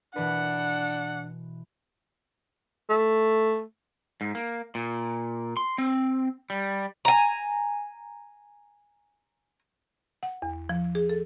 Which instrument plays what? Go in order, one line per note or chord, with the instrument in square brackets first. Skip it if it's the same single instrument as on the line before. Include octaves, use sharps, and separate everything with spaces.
[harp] B2 E3 B4 [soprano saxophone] D4 [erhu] F#5
[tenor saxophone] A3
[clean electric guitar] G#2
A#3
A#2
C6
C4
G3
[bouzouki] G#5 A#5
[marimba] F#5
E2
F3
G#4
A4